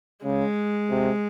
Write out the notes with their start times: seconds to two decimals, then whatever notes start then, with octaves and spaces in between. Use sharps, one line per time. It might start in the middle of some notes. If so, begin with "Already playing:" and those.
0.24 C#3 G#3
0.90 C3